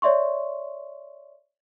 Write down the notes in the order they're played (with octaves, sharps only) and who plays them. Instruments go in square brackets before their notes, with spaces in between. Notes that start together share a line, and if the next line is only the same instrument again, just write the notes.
[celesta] C#5 D5 E5 C6 C#6